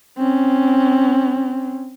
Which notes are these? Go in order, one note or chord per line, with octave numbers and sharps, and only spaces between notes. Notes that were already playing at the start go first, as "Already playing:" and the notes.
C4 C#4